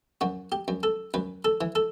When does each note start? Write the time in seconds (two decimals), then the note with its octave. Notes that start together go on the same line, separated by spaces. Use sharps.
0.21 F#2 F#4
0.52 G4
0.68 F#2
0.83 A4
1.14 F#2 B4
1.45 A4
1.61 E3
1.75 A4